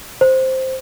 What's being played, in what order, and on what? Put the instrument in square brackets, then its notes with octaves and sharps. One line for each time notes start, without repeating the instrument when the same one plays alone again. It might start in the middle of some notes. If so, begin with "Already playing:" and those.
[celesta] C5